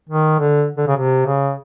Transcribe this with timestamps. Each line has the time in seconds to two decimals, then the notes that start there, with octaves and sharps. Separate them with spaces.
0.09 D#3
0.39 D3
0.77 D3
0.87 C#3
0.97 C3
1.26 C#3